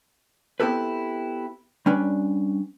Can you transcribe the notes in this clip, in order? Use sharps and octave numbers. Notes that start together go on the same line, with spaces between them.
B3 C4 E4 G4 A4 B4
G3 C#4 D4 B4